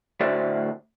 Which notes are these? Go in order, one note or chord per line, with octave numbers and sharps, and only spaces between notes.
D2 A2 F#4 C5 D5 E5